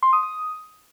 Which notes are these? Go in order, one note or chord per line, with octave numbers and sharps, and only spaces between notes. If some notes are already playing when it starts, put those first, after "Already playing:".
C6
D#6
D#6